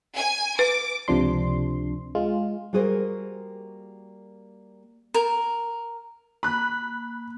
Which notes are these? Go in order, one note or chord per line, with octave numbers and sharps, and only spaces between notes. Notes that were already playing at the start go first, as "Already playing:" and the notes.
G#5
B4 D6
C#2 C3 F3 D4 C6
G#3 F4
G3 A#3 F#4 G#4 A#4 C5
A#4
A#3 B5 F#6